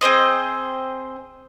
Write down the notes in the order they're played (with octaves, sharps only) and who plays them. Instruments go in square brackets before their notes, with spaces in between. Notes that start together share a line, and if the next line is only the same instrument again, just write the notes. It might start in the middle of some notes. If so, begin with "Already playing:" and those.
[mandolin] C4 G#4 C5 D#5